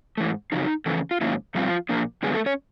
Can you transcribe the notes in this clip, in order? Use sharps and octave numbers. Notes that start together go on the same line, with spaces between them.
G#2 E3 A3
F2 C#3 F#3 D#4
F2 C#3 E3 A3
F4
G#2 D#3 F#3 A#3 C#4 E4
B2 F3 G3 C4 F4
A#2 F3 A#3 D4
G2 D3 F#3 G#3 B3 G#4
A3 A4
C#4 C#5